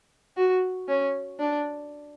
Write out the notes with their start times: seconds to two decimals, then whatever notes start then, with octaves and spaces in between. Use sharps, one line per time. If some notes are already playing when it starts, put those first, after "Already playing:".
0.37 F#4
0.88 C#4
1.39 D4